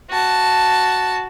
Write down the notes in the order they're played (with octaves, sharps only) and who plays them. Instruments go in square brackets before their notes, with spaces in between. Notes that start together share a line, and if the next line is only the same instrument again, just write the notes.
[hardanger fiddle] F#4 A5